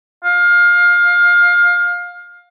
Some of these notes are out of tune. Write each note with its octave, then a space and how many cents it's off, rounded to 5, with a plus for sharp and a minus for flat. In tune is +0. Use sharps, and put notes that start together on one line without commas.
F5 +20